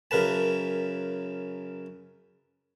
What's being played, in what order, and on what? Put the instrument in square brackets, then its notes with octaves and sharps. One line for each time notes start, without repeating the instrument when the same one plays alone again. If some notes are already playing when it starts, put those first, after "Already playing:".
[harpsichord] F#2 C#3 A#4 B4 A5